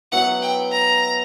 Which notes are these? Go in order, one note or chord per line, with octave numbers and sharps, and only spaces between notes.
F#3 B3 E4 F#5
G5
A#5